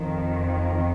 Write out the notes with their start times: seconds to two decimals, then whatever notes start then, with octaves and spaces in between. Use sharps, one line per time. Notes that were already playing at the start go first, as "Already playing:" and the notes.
Already playing: F2 D#3